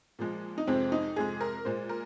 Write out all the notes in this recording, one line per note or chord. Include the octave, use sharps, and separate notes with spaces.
A#2 F3 G#3
D#4
F2 C3 G#3 C4
D#4
F2 C3 G#3 G#4
A#4
A#2 G#3 C5
A#4